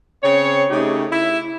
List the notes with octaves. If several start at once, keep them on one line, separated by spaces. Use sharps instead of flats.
C#3 C4 C#5
C#3 A3 D#4 G4
E4 E5